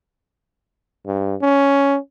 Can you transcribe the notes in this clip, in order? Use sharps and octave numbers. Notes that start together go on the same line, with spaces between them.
G2
C#4